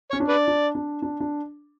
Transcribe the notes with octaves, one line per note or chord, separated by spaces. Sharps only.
C#4 C#5
D4
B4 D5
D4
D4
D4
D4